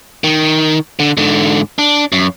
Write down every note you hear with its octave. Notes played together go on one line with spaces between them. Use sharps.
D#3
D3
G#2 D3
D4
F#2